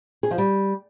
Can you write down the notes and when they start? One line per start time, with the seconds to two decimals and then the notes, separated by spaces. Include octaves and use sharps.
0.23 G#4
0.31 F3
0.38 G3